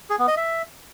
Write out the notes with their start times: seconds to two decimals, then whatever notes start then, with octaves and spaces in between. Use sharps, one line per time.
0.10 G#4
0.19 B3
0.28 D#5
0.37 E5